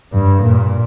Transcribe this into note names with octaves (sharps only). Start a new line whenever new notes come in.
G2
A#2